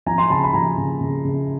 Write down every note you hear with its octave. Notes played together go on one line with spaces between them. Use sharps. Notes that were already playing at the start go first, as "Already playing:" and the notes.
F3 G#5 A#5
C6
C#3 A5 B5
B5
F3 G#5 A#5
C#3
C#3
C#3